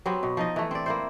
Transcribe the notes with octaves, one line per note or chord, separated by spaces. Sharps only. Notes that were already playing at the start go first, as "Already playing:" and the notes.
F#3 B3 C4 G4
B2
F3 D#4 D#5
E3 A3
C4 D5
A#3 E4 C5